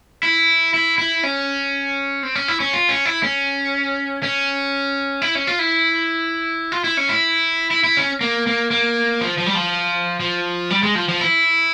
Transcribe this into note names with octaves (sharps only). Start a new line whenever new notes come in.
E4
E4
E4
C#4
C4
C#4
E4
C#4
F4
C#4
E4
C#4
C#4
E4
C#4
F4
E4
F4
E4
C#4
E4
E4
E4
C#4
A#3
A#3
A#3
F3
F3
G3
F3
F3
G3
G#3
F3
F3
E4